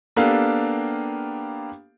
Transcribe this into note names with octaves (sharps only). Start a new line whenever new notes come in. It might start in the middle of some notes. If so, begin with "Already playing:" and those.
A#3 B3 D4 G4 A4 F5